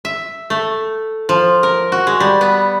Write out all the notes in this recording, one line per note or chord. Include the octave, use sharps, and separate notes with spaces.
E5
A3
F3
A#4
F#4
G#3
G3
B3